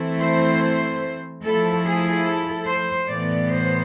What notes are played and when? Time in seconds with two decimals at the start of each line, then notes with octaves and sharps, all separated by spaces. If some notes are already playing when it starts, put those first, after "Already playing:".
Already playing: E3 A3 C4 E4
0.20 C5
1.44 F3 A3 E4 A4
1.84 G#4
2.25 A4
2.67 C5
3.08 A2 E3 B3 D5
3.50 C5